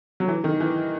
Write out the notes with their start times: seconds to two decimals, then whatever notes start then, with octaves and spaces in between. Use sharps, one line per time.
0.20 F#3
0.28 E3
0.44 D#3
0.60 E3